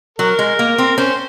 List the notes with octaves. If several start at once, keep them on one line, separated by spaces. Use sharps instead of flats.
F#3 A#4
G#3
A#3
C4
C#4 C5